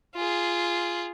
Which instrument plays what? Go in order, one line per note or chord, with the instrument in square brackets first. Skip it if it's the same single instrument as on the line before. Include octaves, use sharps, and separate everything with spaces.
[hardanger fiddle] F4 G#4